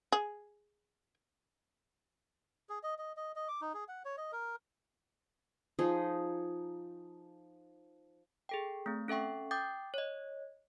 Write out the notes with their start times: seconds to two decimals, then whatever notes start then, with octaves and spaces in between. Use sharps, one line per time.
0.12 G#4
2.69 G#4
2.83 D#5
2.98 D#5
3.17 D#5
3.36 D#5
3.48 D6
3.61 D#4
3.74 G#4
3.88 F#5
4.05 C#5
4.18 D#5
4.32 A#4
5.79 F3 D#4 G#4
8.49 G#4 A4 G5
8.86 A3 C4
9.08 C#4 A4 E5 G5 C#6
9.51 G5 D6 D#6 G6 A6
9.94 C#5 D#5